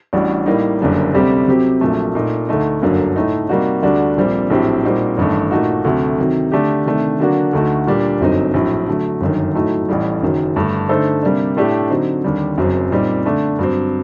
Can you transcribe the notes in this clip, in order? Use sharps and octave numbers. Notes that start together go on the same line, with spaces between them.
A1 A2 G3 D4 F#4
A2 G3 A#3 D#4
F#1 F#2 D3 G3 A#3
D2 C3 G3 C4 G4
C3 F#3 C4 G4
A#1 A#2 F#3 A3
A#2 A3 D#4
D2 D3 A3 D#4
G1 F#2 D3 F#3 A#3
A2 A3 D#4
C3 G3 A#3 D#4 F#4
D2 D3 G3 D4 F#4
A#1 A#2 G3 C4
A#1 A2 F#3 C4 G4
A#2 G3 C4 D#4 F#4
A1 G2 D#3 A3
A#2 A3 D#4 F#4
D2 C3 F#3 A3
C3 D#3 F#3
D3 A3 D4 G4
C3 D#3 A3 D4
D3 F#3 A#3 D4 F#4
D2 D3 A3 D#4 F#4
A#2 G3 D4 G4
G1 F#2 F#3 C4 D#4
A#1 A2 F#3
D3 F#3 A3
G1 F#2 D#3
A2 F#3 A3 D#4
A1 A2 G3
F#1 F#2 D#3 F#3
G2 D3 A3
D3 A3 D#4 A4 C5
C3 G3 A#3 D4
A2 A3 D4 G4
D3 F#3 C4 D#4
D#2 D3 G3
F#1 F#2 F#3 C4
A#2 G3 C4 D#4
D3 A3 D4
G2 F#3 C4